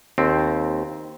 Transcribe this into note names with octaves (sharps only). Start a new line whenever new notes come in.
D#2 C4